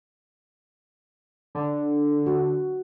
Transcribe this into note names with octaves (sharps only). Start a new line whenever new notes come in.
D3
F#4